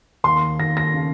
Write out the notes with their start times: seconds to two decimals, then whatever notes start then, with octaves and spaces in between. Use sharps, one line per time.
0.24 D#2 C6
0.59 D#2 A#6
0.77 A#6
0.94 C#3